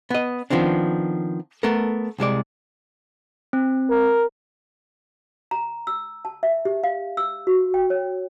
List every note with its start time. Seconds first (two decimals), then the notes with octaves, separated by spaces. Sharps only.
0.10 B3 D#5
0.50 D#3 F3 B3 C4 D4
1.63 A3 B3 A4 A#4
2.18 C2 C3 G#3 D5
3.53 C4
3.90 A#4
5.51 A#5
5.87 E6
6.25 A5
6.43 E5
6.65 G4
6.84 F5
7.17 E6
7.47 F#4
7.74 G5
7.90 C#5